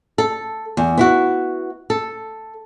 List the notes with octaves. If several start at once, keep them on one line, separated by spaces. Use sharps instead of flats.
A4
E2
B3 E4 F#4
A4